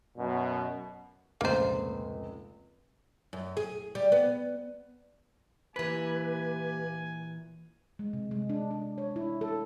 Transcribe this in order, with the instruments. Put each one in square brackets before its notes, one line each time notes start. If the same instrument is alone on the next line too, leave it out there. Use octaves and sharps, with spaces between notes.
[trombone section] F#2 B2
[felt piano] F1 C#2 A#2 [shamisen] A#3 C5
[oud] F#2
G#4
G3
B3
[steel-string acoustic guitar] A#2 E3 [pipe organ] A#3 G4 [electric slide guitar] B4 [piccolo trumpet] G#5
[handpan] G#3
C3
G#3
D4
D4
C#5
E4
A4